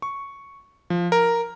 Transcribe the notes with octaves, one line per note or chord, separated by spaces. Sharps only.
C#6
F3
A#4